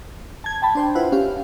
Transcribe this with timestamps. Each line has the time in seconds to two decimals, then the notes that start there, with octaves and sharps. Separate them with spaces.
0.44 A5 G#6
0.62 G5 A5 B5
0.75 D4 C5 G5
0.95 E4 F4 B4 C5 F#5
1.12 C#4 G4 F5